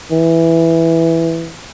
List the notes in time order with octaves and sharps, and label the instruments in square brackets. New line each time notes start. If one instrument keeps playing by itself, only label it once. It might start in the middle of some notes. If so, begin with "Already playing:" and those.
[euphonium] E3